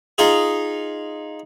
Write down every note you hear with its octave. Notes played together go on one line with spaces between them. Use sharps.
D#4 F4 G#4